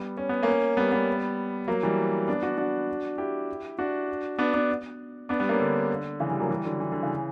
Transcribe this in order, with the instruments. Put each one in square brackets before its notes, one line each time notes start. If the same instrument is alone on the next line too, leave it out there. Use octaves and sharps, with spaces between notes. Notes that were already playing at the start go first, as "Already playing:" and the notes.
Already playing: [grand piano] G3 B3
C#4
B3
A#3 C#4
G3 B3
G3 B3
F#3 A#3
E3 G3
B3 D4
D4 F#4
D4 F#4
E4 G4
D4 F#4
B3 D4
B3 D4
B3 D4
G3 B3
A#3 C#4
D3
C#3 E3
E3 G3
F#3 A#3
E3 G3
D3 F#3
E3
D3
C#3 E3